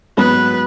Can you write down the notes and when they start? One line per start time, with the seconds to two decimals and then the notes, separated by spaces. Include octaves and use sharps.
0.18 G#2 F#3 B3 B4